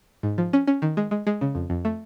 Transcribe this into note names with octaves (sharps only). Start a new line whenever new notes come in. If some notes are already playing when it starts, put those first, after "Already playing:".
G#2
F3
C#4
C#4
D#3
G#3
G#3
G#3
C#3
F2
F2
A3